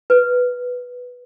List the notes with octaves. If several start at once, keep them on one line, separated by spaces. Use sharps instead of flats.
B4